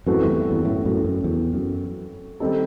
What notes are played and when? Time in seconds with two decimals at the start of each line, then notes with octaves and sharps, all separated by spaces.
0.06 F#2 A2 E3 A3 C4 F#4
0.22 E2 G2
0.51 E2 G2
0.65 F#2 A2
0.85 F#2 A2
1.05 F#2
1.24 E2
1.54 F#2
2.40 D#3 G3 C4 D#4 A4